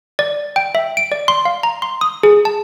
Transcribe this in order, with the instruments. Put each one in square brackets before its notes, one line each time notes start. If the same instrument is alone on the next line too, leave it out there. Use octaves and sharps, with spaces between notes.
[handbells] D5
G5
E5
D7
D5
C6
F5
A#5
C6
D#6
G#4
A5